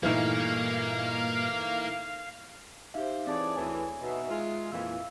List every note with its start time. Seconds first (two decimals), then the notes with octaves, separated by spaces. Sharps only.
0.03 G2 A#2 E3 A3 A#3 D#4 F5
2.94 D#4 G4 C5 E5 F5
3.27 E3 C4 G#4 C#5 D5 A5
3.56 D2 E3 G#5
4.00 B2 D#4 E5
4.30 G#3 F4
4.72 F2 A#2 E3 F4 F5 E6